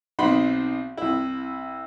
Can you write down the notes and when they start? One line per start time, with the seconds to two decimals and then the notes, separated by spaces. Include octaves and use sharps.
0.19 B1 C4 D#4 F#5 B5 C6
0.97 C2 E4